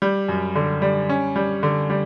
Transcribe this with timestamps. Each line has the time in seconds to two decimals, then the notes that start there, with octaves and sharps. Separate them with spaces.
0.02 G3
0.28 F#2
0.55 D3
0.82 G3
1.09 C#4
1.36 G3
1.63 D3
1.90 G3